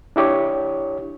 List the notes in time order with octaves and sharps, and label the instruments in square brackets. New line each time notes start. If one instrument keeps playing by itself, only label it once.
[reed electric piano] D4 E4 G4 C#5